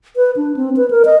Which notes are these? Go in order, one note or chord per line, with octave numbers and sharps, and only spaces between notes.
B4
D4
C4
B4
A#4
D#5